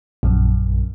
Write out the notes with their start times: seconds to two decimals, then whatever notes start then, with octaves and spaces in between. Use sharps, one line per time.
0.23 A#1 F#2